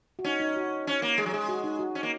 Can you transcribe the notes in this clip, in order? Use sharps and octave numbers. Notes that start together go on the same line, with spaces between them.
F#4
C#4 D#4
D#4
F#4
C#4
A#3
G#3 G#4
F#3
G#3 G#4
F#4
D#4
F#4
C#4
A#3